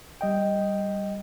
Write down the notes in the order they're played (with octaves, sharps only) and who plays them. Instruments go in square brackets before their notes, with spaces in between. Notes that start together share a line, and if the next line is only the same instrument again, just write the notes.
[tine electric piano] G3 D#5 G5